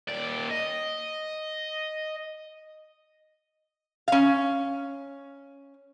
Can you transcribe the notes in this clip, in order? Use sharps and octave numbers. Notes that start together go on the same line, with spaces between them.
D#2 D5
D#5
C#4 F5